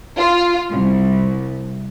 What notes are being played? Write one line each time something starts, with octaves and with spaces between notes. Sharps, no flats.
F4
C2